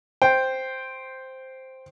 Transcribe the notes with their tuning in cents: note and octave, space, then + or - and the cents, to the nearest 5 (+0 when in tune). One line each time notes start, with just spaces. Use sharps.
C5 +0 G5 +0